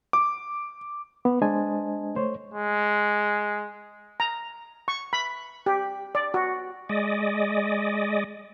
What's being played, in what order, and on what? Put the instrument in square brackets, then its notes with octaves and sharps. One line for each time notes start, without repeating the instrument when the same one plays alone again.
[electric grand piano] D6
[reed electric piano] B3
G#3 D4 C5 D#5 G#5 A5
A3 C5 C#5
[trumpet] G#3
[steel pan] A#5
C#6
B5
G4
D5
F#4
[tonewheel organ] G#3 D5 D#5